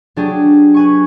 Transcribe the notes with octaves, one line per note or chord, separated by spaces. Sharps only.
F#3 D4 G4 G#4
B4 G#5 C#6